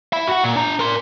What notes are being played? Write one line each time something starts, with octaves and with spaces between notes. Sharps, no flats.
E5 B5
F#4 F#5
A#2
D4 A#5
A#4 C6